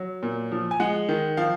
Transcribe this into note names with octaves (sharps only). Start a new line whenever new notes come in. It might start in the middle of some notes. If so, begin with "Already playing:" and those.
Already playing: F#3
A#2
F3
G#5
G#3 F#5
D#3
F3 F5